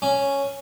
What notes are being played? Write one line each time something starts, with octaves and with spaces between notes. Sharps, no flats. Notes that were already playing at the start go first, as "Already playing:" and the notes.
C#4